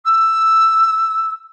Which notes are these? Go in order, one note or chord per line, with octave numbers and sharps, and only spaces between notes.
E6